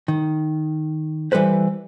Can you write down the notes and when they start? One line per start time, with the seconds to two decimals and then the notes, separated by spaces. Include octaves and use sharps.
0.08 D#3
1.32 E3 G3 A4 B4 C5